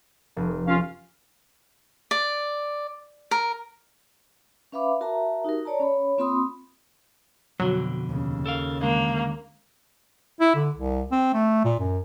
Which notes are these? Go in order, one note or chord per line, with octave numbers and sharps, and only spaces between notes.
F1
C#4 F4 F5
D5
A#4
C#4 B4 E5 F5 B5 D6
F#4 A#4 E5 A5 A#5
D#4 F#4 G4 A#4
C#5 D5 A5 A#5
C#4 C#5 B5
A#3 C4 F4 B5 C6 D#6
F2 B2 D3 F#3
D#2 C#3
A4 A#4 F5
D3 D#3 G#3 A#3
E4
D3
C2
C4
A3
A#2
F#2